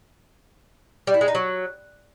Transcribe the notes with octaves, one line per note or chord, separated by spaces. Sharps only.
G3
E4
G#3
D#4
F#3